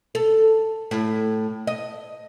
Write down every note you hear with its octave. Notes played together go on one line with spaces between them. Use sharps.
A4
A2
D#5